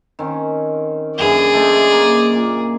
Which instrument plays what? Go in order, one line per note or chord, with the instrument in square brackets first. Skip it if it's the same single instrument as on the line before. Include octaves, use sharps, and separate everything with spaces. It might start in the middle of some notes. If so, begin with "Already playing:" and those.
[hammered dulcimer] D#3 C4 C#4
[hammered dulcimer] F#2 D3 E3 [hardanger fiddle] G#4 D5
[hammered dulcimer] A3 C5 D#5
A#3
A#2